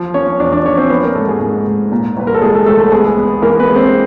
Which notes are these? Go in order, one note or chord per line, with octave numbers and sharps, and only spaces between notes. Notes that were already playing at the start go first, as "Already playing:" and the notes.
Already playing: F3
F3 C#4 C#5
E2 D4 D5
D4 D5
F3 C#4 C#5
C4 C5
F3 B3 B4
A#3 A#4
G#2 A3 A4
G#3 G#4
G#2
G#2
A#2
C2 B4
A#4
A4
A#2 G#3 G#4
A3 A4
C2 A3 A4
A3 A4
G#3 B3 G#4
B3
E3 A#3 A#4
B3 B4
G#3
C4 C5